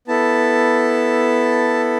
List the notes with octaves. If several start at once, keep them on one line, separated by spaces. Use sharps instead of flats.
B3 E4 A4 A5